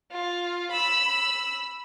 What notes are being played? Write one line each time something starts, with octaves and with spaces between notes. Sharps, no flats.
F4
B5 E6